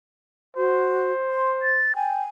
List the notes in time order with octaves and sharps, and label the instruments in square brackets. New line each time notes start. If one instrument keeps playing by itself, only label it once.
[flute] F#4 [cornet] C5
[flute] C6
A6
[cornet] G5 [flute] G#5